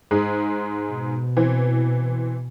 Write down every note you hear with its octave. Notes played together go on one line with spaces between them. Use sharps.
G#2 G#3
B2
E3 C4